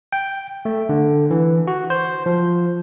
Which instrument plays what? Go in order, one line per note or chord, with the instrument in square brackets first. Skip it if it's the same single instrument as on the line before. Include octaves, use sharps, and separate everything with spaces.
[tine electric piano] G5
A3
D3
E3
F#4
C5
F3